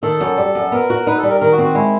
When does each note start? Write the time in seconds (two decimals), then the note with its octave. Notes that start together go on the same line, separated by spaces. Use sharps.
0.03 D#3 A4
0.21 F#2
0.37 G3
0.55 F#2
0.72 B3 A#4
0.90 F#4
1.06 D#4 B4
1.18 A4
1.23 G3
1.30 A#4
1.41 D#3 A#4
1.52 F#4
1.58 C4
1.64 F#4
1.75 G#3 E4